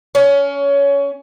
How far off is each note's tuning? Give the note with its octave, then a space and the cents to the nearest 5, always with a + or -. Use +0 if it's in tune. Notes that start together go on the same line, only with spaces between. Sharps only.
C#4 +20